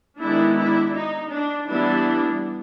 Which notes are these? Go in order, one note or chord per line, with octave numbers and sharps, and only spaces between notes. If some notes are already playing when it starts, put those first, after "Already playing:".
D#3 G#3 B3 D4 E4
D4 E4
D#4
D4
E3 G3 B3 D4 E4